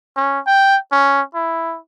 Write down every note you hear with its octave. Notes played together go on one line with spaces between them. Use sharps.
C#4
G5
C#4
E4